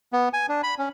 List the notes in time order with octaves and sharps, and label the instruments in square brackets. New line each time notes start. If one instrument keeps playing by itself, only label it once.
[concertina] B3
G#5
D4
B5
C#4